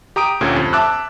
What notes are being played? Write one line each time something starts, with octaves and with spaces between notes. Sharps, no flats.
G4 A#5 D#6 D7
D2 A#2 A3 C#4 G4 G#6
F2
E5 A5 D6 E6 F#6